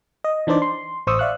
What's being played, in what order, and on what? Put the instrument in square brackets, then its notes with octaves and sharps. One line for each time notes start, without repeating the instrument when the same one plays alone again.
[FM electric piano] D#5
E3 D4 D#4 C5 D5
C6
A1 C5 C#6 D#6 E6
D5 E5 F5 C#6 F#6